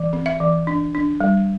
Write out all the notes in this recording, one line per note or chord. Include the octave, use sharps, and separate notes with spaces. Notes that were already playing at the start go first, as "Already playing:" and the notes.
Already playing: E3
C4
E5
E3
D4
D4
G3